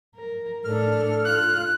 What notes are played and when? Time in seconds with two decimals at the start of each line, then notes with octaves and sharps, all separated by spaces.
0.16 A#4
0.64 A2 D4 A4 F6
1.25 F4 F#6